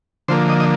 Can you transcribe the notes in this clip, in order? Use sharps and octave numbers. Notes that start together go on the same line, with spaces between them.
D3 F3 A#3 C5
D#5
D#5